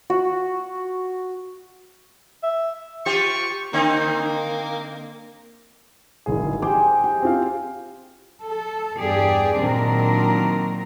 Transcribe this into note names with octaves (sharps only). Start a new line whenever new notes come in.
F#4
E5
F4 G4 C5 C#6
D3 A#3 C4 D#4
D1 G#1 G#4
G4 G#4 C5 G5 D6
G4
C4 F4 F5
A4
E2 G2 G4 G#4 D5
A#2 D#3 F#3 C4 D4 A#4